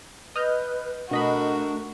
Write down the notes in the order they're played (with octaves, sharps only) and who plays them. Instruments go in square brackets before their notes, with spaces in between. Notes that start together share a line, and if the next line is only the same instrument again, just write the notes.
[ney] B4 [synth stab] D#5 F6 G6
[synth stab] B2 D#5 B5 [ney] A3 [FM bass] D4 [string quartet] F#4 A#4